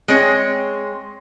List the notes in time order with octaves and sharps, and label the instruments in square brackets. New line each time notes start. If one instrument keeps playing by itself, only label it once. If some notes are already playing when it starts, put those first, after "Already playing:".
[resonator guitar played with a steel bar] G#3 C4 C#5